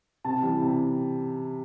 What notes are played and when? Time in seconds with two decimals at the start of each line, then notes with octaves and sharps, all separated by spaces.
0.24 C3 A5
0.43 E3 G3
0.61 C3